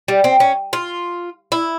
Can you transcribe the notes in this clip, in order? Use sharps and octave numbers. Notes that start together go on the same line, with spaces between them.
G3
C4
C#4
F4
E4